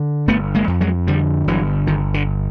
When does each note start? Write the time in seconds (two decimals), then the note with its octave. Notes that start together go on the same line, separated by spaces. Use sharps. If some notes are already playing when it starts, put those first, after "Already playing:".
Already playing: D3
0.28 G1 A3 B3
0.55 G#3 A#3
0.68 F2
0.81 F#3 G#3
1.07 D3 F3 G3
1.47 G1 E3 F#3
1.87 G1 D#3
2.14 D3